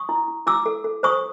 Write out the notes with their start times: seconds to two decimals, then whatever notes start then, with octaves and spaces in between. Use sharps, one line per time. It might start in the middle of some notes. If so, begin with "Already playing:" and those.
Already playing: C#6 D#6
0.09 E4
0.28 E4
0.46 E4 D6 E6
0.66 A4
0.84 A4
1.03 C5 C#6 D#6